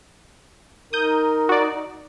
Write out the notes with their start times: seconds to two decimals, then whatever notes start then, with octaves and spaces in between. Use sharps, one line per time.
0.93 D#4 A#4 D#6 G6
1.49 F#4 D5